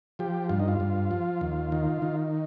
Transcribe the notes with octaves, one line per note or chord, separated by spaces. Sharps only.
F3 G4
G2 F4
D#4
F4
G2
F3
D#2
D#3
D#3